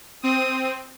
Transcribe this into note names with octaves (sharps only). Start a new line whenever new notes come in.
C4 D#6